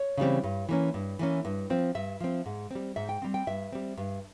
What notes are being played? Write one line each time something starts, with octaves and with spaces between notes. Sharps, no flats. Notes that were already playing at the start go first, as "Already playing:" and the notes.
Already playing: C#5
C#3 E3 G3 C4
G2
E3 A#3 C#4
G2
E3 A#3 C#4
G2
F3 C4
G2 E5
F3 C4
G#2
G3 C4
G#2 E5
G5
G3 C4
G5
G2 E5
G3 C4
G2